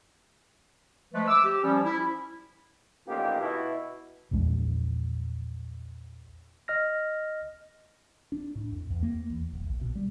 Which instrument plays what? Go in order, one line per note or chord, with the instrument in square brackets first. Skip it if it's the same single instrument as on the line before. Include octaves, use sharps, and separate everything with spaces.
[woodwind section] F3 G#3 A3 B4
D6 E6
G4
F3 G3 C#4
E4
[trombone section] A1 A#2 D#3 A#3 B3 G4
B2 E4
[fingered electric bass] A#1 E2 A#2 G#3
[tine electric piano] D#5 F6 A#6
[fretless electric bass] D4
A2
F2
E2
A#3
E2
D#1
A#1
B2
G3